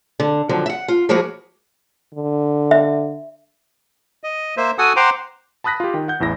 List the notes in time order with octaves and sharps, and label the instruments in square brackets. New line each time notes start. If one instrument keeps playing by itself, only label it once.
[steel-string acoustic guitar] D3
D3 D#3 F3 F#3
E5 F#5
F4
F3 G#3 A#3 E4 F#4 G#4
[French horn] D3
[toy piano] E5
[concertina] D#5
A#3 C5 E5
F#4 A4 F#5 G#5 D#6
C5 F#5 G5 A#5 C6 D6
[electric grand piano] A5 B5 D#6 F#6 A#6 B6
F4 G4
D#3 G5
F#5 G6
A1 E2 E4 A#6